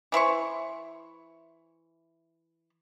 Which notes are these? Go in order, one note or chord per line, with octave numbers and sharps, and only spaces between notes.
E3 E4 C5 C#6